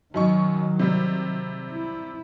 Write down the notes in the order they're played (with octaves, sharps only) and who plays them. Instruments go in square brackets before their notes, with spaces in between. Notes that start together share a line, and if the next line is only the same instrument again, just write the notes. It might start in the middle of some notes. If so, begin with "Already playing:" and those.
[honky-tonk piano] F#2 D#4 C#6 [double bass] D#3 F#3
[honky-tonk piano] C3 G3
[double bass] E4